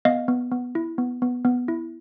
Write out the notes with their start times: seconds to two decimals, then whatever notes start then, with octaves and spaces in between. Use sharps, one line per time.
0.05 B3 D#5 F5
0.28 B3
0.52 B3
0.75 E4
0.98 B3
1.22 B3
1.45 B3
1.68 E4